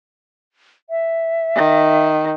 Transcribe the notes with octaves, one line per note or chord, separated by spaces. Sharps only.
E5
D#3